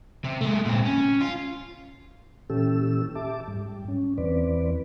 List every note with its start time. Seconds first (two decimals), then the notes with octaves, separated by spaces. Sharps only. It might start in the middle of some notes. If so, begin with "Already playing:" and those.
0.24 C3
0.41 G#3 A3
0.65 A#2 C4
0.85 C#4
1.21 F4
2.50 A#2 E3 C#4 G4 A4 E6
3.15 G4 E5 A5 D6
3.48 G#2 G3
3.88 C#4
4.18 E2 E3 C4 B4 D5